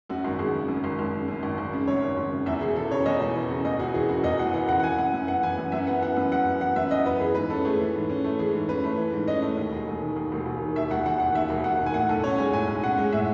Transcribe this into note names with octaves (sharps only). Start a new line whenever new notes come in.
F#2 F#4
G#1
G#1 G#4
C#3
F#2
G#1
G#1
C#3
F#2
G#1
G#1
C#3
F#2 C#5
G#1
G#1
C#3
E2 E5
E1 G#4
E3 A4
C#3 C#5
E2 D#5
E1
E3
C#3
E2 D#5
E1 F#4
E3 G#4
C#3 F#4
E2 D#5
E1 F#5
E3 F#5
C#3 F#5
F#5
E3 G#5
F#2 F#5
F#2
B3 F#5
E3 G#5
F#2
F#2 E5
B3 F#5
E3 F#5
F#2
F#2 F#5
B3
E3 F#5
F#2 E5
F#2 D#5
B3 B4
E3 G#4
G#2 B4
C#4 A4
A3 G#4
E3
G#2
C#4
A3
E3 G#4
G#2
C#4 B4
A3
E3
G#2
C#4 D#5
A3
D#2
E1
E1
D#3
D#2
E1
E1
D#3
D#2 E5
E1 F#5
E1 F#5
D#3 F#5
D#2 E5
E1
E1 F#5
D#3
G#5
A2 F#5
B1 A4
C#4 C#5
G#3 G#5
A2 G#5
B1
C#4 F#5
G#3
A2 E5